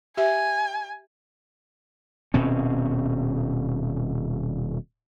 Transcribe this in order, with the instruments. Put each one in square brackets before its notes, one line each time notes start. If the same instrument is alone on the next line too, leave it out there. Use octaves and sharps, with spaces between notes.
[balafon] G4 E5 [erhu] G#5
[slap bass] D#1 B2 C4 C#4